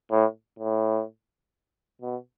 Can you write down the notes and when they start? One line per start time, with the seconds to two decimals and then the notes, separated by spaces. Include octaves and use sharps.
0.11 A2
0.59 A2
2.02 B2